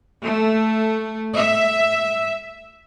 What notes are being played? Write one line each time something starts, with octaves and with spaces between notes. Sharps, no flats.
A3
E5